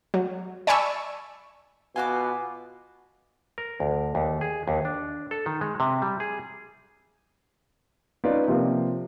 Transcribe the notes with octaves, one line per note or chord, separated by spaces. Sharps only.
F#3
D5 G#5 A5 B5 C#6 E6
B2 F4 F#4 G#5 D6
A#4
D2
D#2
G#4
D#2
D4
A4
D#3
G#3
C3
G3
G#4
C#4 D#4 F4 B4 D5
C3 F3 A#3